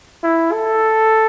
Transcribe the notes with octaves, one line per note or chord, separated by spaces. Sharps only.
E4
A4